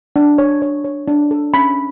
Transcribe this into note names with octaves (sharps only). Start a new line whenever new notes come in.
D4
C#5
C#5
C#5
D4
A4
C#4 B5